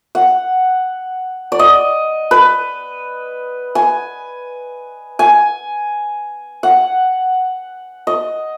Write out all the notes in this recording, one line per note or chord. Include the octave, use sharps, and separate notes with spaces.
F#5
D5
D#5
B4
G#5
G#5
F#5
D#5